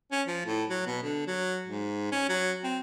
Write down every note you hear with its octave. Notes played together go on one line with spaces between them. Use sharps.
C#4
F3
A2
F#3
B2
D3
F#3
G#2
C#4
F#3
C4